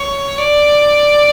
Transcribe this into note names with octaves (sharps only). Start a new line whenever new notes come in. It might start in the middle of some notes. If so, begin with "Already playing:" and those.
Already playing: C#5
D5